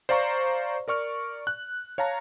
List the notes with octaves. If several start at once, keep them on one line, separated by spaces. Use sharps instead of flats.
C5 D5 F5 A#5 C#6
A#4 D5 C#6 F6
F#6
C#5 F5 A5 A#5